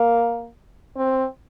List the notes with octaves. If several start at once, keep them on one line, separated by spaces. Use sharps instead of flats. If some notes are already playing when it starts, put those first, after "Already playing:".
Already playing: A#3
C4